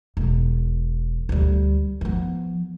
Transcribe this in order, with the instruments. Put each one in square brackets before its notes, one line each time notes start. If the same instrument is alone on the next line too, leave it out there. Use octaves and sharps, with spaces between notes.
[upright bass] E1
D2 G3
F3 B3